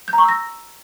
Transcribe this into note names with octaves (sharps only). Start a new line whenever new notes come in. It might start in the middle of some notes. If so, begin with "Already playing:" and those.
G6
A#5
C#6
E6
A#6